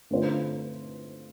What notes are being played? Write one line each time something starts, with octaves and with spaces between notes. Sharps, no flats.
D3 A3 C4 F4 C5